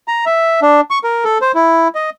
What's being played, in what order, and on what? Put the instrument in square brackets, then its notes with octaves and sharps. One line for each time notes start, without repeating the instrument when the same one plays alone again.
[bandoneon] A#5
E5
D4
C#6
A#4
A4
C5
E4
D#5